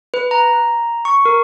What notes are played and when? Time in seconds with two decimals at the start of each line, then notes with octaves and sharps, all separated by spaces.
0.14 B4
0.31 A#5
1.05 C#6
1.25 A#4